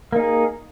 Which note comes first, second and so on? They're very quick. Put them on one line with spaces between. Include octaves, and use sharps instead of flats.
A#3 D#4 G#4